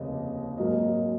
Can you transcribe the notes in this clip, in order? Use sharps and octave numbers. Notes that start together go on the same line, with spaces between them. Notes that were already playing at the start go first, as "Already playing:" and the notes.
Already playing: F1 D#2 C#3 A#3 D#5
G#2 F#3 A#3 D#5